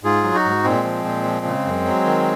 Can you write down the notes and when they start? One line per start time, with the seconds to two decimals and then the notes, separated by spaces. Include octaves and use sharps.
0.03 G#2 F4 G#4
0.24 F#3
0.35 D#4 F#4
0.45 G#2
0.64 A#2 G#3 C4
0.84 F3
1.05 A#2
1.26 F3
1.45 C#3
1.65 F#2
1.85 F#3
2.06 D#3